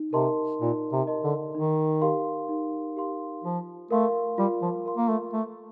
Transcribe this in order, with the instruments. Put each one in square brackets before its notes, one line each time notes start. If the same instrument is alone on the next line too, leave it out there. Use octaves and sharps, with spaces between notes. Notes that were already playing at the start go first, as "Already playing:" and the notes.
Already playing: [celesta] D#4
[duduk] C3 [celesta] A#4 D#5 A5 C6
[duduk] A#2 [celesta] D#4
[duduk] C3
[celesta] A#4 D#5 A5 C6
[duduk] D3
[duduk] D#3 [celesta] D#4
[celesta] G4 A#4 F5 C6
D#4
G4 A#4 F5 C6
[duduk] F3 [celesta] F4
[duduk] A3 [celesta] A#4 F5 C6
[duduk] G3 [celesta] F4
[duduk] F3
[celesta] A#4 F5 C6
[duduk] A#3
A3
[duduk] A3 [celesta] A4